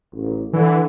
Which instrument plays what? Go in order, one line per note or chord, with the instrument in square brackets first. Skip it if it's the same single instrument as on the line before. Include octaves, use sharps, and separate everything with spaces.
[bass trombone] A1
[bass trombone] D3 [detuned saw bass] E3